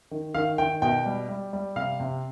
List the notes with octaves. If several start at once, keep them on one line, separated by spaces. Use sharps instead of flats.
D#3
D#3 F5
D#3 G5
B2 G5
G3
G3
G3
C3 F5
C3